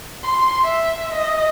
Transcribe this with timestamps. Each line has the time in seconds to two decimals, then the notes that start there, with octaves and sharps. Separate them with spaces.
0.23 C6
0.64 E5
1.13 D#5